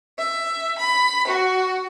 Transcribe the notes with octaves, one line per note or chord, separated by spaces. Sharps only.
E5
B5
F#4